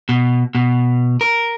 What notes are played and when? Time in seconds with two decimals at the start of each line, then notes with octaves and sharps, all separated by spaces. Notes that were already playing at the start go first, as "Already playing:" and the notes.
0.09 B2
0.55 B2
1.21 A#4